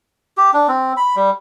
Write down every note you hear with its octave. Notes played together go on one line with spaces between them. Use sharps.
G4
D4
C4
B5
G3